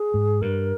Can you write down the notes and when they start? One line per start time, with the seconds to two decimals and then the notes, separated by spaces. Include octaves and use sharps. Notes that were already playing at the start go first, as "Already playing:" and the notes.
Already playing: G#4
0.14 G#2
0.41 G2 A#4